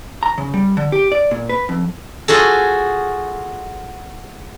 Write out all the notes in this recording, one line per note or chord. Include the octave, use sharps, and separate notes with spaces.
A#5
C#3
G3
D3
G4
D5
A#2
B4
F2
F4 F#4 G#4 A4